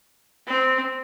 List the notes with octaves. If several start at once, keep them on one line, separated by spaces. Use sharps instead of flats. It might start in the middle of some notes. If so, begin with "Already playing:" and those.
C4